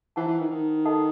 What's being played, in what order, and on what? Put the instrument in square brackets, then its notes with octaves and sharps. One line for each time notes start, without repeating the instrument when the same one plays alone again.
[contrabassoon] E3 [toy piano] E4 C5 F#5 A5
[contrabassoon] E3
D#3
D#3
[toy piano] A4 D#5 F#5 A5